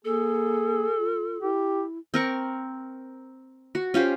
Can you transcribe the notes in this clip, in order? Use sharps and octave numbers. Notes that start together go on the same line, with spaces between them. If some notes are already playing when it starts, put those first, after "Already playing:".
A#3 G#4 A4
F4
E4 G4
C4 A#4 C#6
F#4
C#4 F4 G4 C5